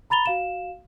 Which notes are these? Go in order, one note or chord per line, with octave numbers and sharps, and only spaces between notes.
A#5 B5 A6 F7 G7
F#4 F5 E7